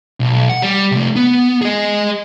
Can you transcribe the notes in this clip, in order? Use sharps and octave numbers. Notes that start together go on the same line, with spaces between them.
B1
F#5
G3
C3 A3
B3
G#4 D#5